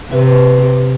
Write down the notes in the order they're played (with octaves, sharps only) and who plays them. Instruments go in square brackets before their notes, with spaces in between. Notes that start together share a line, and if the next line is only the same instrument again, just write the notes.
[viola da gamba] C3 [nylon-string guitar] B4 E5